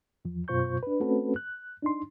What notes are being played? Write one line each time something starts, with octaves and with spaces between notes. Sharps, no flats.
E2 F3
F#2 B2 F4 C5 C#6 G6
D4 B4
A3 C4 C#4 F#4 A4 B4
F#6
D4 D#4 C6